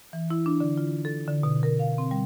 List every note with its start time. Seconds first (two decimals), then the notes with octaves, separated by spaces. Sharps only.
0.13 E3
0.30 E4
0.46 D4
0.60 D3
0.78 F4
1.05 A4
1.28 D3
1.43 B2
1.63 A#4
1.79 F5
1.98 C4
2.11 G3